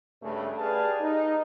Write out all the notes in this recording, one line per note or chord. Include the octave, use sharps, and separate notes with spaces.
G2 C#3 A3
G4 G#4 B4 D5 F5 A5
D#4